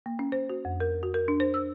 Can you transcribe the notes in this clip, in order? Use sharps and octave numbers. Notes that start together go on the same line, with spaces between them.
A#3
C#4
C5
F#4
F2
A#4
F#4
A#4
D4
C5
E6